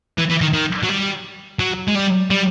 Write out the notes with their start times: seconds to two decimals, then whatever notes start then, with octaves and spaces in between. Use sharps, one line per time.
0.18 E3
0.30 E3
0.41 D#3
0.54 D#3
0.84 F#3
0.89 G3
1.60 F#3
1.88 G#3
1.95 G3
2.30 G3